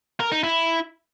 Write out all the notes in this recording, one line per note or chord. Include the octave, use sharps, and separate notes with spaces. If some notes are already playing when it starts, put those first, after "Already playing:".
A#4
D#4
E4